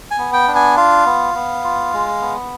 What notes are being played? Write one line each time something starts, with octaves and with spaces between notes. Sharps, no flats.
G#5
B3
G5
D4
G#5
F4 F5
B3
B3
F4
G#3
B3